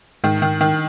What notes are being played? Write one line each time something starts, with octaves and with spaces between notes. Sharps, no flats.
G#2 D#3
D#3
D#3